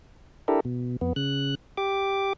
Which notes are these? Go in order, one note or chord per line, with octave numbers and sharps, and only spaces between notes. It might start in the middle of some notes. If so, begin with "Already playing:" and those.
D4 E4 G4 A4 A#4
B2
F2 B3
C#3 F#6
G4 D6